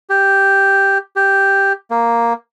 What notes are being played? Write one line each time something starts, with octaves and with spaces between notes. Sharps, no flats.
G4
G4
A#3